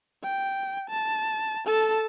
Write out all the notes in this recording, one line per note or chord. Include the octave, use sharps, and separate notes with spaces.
G5
A5
A4 A5